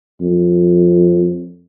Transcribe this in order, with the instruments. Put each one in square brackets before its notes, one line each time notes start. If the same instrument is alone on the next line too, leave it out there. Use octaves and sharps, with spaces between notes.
[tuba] F2